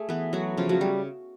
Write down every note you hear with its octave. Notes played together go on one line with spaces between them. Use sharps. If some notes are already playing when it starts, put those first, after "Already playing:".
Already playing: A3 G#4
E3 B3 B4
F#3 A3 F#4
C#3 F3 F4
F#3 F#4
G3